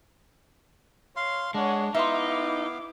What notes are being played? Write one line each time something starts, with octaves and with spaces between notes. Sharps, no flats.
C#5 F5 C6
G#3 D4 C#5 F#5
B3 D#4 E4 E5 F5 C6 D6